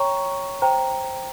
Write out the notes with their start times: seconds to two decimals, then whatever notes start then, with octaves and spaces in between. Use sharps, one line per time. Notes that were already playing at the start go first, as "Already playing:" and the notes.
Already playing: C#5 G5 A#5 C#6
0.62 C5 G5 A#5